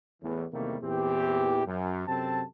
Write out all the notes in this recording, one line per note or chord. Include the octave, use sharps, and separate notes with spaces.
E2 A2 E3
E2 C3 D#3 G3 A3 A#3
E2 A#2 E3 C4 G4
F#2
F#2 C3 C4 A4 A5